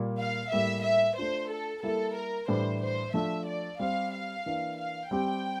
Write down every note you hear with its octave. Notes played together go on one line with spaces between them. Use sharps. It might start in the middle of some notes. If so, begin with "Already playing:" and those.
Already playing: A#2 G3 A#3
F5
A2 G3 A#3 E5
E5
A3 D4 F4 C5
A4
G3 A#3 E4 A4
A#4
A2 E3 G3 D4 C5
C5
F3 A3 D4 E5
D5
G3 C4 G4 C5 F5
F5
E3 A#3 D4
F5
G3 C4 G4 G5